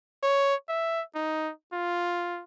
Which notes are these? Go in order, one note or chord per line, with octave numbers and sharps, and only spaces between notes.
C#5
E5
D#4
F4